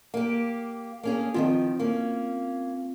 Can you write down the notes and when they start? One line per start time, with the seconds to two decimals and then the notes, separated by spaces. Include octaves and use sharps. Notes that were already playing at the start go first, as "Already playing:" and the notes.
0.14 A#3 G4
1.03 A#3 C#4 G#4
1.34 D3 D#3 F3 C4 F4
1.79 A#3 C#4